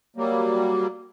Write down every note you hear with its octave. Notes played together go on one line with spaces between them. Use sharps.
F#3 G3 A#3